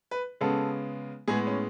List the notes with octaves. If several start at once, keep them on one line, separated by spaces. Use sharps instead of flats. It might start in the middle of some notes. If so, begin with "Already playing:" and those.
B4
C#3 G#3 B3 A4
A2 G#3 B3 G#4
C#4